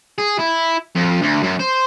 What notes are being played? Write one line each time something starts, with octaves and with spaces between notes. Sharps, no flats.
G#4
E4
F2
D2
F#2
C5